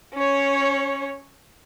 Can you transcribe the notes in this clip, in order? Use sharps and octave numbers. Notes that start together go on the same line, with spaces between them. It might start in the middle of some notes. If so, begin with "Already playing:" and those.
C#4 C#5